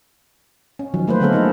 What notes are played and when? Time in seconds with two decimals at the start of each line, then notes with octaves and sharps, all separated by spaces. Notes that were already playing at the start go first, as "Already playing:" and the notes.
0.79 C#4
0.94 D#3 F3 F#3
1.08 A3 A#3 B4 C5
1.21 D3 G#3 B3 C#4 A4 A#4
1.33 C#4 D#4 A4